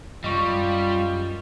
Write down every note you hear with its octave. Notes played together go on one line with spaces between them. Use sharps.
F#2 G3 F4 D#5 C#6